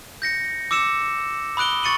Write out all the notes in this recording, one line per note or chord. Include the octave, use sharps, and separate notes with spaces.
G6 A#6 C#7
D6 E6 C#7 E7
B5 D#6 F#6 D7 G7
C#6 A6 C#7 D#7 F#7